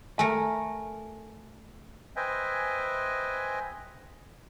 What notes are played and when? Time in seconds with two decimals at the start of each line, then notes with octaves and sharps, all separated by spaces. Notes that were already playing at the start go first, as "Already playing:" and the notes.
0.19 A3 A#4 G#5
2.16 B4 C5 D#5 E5 G5 G#5